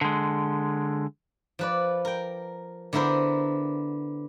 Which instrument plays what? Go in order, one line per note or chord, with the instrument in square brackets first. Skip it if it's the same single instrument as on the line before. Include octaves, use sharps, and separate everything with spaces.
[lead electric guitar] D3 G#3
[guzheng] F3 B4 D5
A#4 G5
D3 B3 E4 A#4 C5